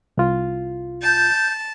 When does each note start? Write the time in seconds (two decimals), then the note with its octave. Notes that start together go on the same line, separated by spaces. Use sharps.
0.17 C2 F4
1.02 A5 G6